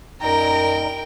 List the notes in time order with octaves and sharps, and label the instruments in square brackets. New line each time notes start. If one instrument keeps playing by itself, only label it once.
[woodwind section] F#2 [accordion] A#2 G3 D#4 [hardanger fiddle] A#4 G5 [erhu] A#5